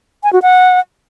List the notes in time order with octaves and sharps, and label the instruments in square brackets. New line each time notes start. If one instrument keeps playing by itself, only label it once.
[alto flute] G#5
F#4
F#5